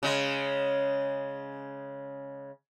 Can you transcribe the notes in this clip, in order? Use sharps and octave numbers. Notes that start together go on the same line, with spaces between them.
C#3 G#3